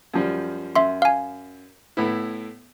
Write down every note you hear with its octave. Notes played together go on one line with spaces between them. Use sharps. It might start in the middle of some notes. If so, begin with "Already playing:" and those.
F#2 F3 G3
F#2 E5 C6
F5 G#5
A2 B3 E4